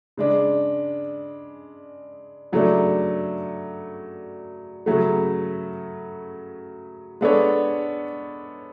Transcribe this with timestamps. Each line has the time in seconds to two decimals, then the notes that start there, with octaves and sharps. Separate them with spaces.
0.17 C#3 G#3 D4
2.52 C#3 F#3 A3 D4
4.86 C#3 F#3 A3
7.21 G#3 B3 D4 A4 C#5